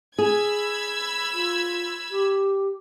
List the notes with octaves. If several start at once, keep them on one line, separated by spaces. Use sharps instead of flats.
G#4 B5 E6 G#6
F4
G4